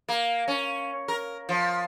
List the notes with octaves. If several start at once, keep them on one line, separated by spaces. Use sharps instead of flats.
A#3
C#4
A#4
F3